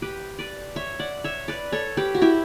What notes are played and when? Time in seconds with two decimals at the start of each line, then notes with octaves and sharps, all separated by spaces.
0.02 G4 B4
0.39 B4 D5
0.76 C#5 E5
0.99 D5 F#5
1.24 C#5 E5
1.48 B4 D5
1.72 A4 C#5
1.97 G4 B4
2.15 F#4
2.22 E4 G4